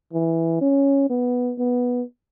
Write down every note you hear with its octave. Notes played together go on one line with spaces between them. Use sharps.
E3
C#4
B3
B3